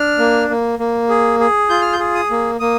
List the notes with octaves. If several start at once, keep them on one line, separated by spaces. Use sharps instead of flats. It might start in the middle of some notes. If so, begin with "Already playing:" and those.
Already playing: D4 F6
A#3
A#3
A#3
G#4
G#4
F4 G6
F6
G6
G#4
D#6
A#3
A#3 D#6